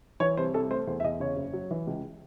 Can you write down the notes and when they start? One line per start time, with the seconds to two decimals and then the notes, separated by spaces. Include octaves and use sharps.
0.20 E3 C#5
0.37 C2 C5
0.54 C2 A4
0.71 A3 C5
0.87 E2 C5
1.00 E5
1.04 E2 D#5
1.20 C#3 C#5
1.37 F#1
1.53 F#3
1.71 E3
1.87 C#2